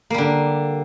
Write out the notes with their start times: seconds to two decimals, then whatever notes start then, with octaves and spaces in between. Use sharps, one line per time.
0.10 A#3
0.14 G3
0.18 D3